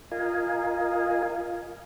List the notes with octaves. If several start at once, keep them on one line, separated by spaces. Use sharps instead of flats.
F4 A#4 D#5 F5 G#5